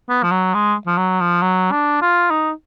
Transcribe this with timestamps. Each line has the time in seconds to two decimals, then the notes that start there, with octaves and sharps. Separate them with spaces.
0.09 B3
0.23 F3
0.31 F#3
0.54 G#3
0.87 F3
0.97 F#3
1.21 F3
1.42 F#3
1.72 D4
2.02 F4
2.31 D#4